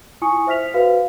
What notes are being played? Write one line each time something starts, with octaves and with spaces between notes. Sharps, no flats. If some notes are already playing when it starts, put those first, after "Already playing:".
E4 F4 G#5 C#6 D#6 C#7
C5 E5 F6 B6 F7
F#4 B4 C5 F5